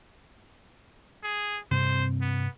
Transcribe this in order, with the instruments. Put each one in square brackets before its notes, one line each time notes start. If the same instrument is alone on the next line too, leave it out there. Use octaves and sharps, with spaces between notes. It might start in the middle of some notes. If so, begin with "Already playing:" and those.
[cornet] G#4
[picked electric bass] G2 C3 C4 [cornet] C5
[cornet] B3